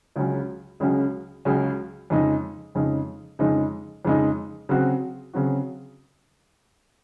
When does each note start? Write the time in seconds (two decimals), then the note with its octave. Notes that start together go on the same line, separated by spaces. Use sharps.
0.16 C#2 C#3 F#3 C#4
0.80 C#2 C#3 F#3 C#4
1.45 C#2 C#3 F#3 C#4
2.10 F2 C#3 G#3 D#4
2.75 F2 C#3 G#3 D#4
3.39 F2 C#3 G#3 D#4
4.05 F2 C#3 G#3 D#4
4.69 C#3 F#3 C4 F#4
5.33 C#3 F#3 C4 F#4